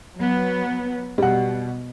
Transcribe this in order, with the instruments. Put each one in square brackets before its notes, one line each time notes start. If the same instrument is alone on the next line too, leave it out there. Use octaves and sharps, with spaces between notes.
[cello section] F#3 B3
[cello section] B2 [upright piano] G3 F#5